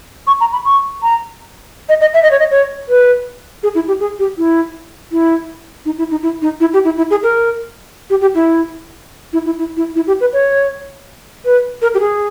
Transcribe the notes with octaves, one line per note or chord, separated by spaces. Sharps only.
C#6
A#5
B5
C#6
A#5
D#5
D#5
E5
D#5
C#5
D#5
C#5
B4
G#4
E4
G4
G#4
G4
E4
E4
D#4
E4
D#4
E4
D#4
E4
G4
E4
E4
G#4
A#4
G4
G4
E4
E4
E4
E4
E4
E4
G4
B4
C#5
B4
A#4
G4
G#4